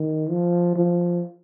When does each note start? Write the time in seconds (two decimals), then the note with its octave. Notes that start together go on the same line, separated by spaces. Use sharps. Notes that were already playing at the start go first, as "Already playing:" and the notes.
Already playing: D#3
0.30 F3
0.76 F3